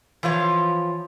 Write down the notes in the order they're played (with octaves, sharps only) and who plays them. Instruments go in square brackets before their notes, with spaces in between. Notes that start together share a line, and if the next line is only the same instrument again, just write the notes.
[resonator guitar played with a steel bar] E3 F3 F4 C#5